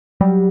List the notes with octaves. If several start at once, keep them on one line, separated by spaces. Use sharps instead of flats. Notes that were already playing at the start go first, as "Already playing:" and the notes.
F#3 G3